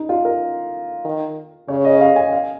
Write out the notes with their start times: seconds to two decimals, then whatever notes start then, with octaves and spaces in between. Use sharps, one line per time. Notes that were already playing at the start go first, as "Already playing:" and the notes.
Already playing: D#4
0.09 F4
0.25 A#4
1.05 D#3
1.68 C#3 C#5
1.85 D#5
2.01 F5
2.16 G#5
2.32 F5